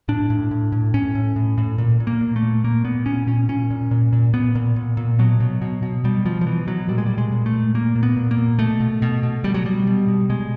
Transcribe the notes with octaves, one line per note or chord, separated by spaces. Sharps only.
A2 D4
A2
A2
A2
A2 C#4
A2
A2
A2
A#2
A#2
A#3
A#2
A3
A#2
A#2 A#3
A#2 B3
A#2 C#4
A#2 C#4
A#2 C#4
A#2
A#2
A#2
A#2 B3
A#2
A#2
A#2
B2 F#3
B2
B2
B2
B2 G3
B2 F3
F3
B2 E3
B2 F#3
A#2 G3
G#3
A#2 G3
G#3
A#2
A3
A#2
A#2 A#3
A#2
B3
A#2
A#3
A#2
B2 A3
B2
B2
B2
B2 G3
F#3
B2 G3
B2
B2
B2 G#3